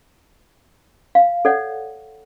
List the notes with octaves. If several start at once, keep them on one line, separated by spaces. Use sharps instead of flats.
F5
A4 C#5 D5 F#5